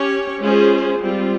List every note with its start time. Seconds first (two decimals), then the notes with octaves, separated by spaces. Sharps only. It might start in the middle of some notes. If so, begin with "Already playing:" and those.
Already playing: C#4 G4 C#5
0.43 G#3 C#4 F4 G#4 C5
1.02 G3 C4 F4